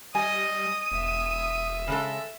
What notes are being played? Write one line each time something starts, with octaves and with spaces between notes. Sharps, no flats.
G3 D#5 G#5 D#6
E1 E5
C#3 G#3 A4